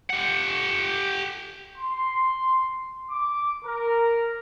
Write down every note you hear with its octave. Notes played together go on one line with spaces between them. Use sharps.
G4 F#5
C6
D6
A#4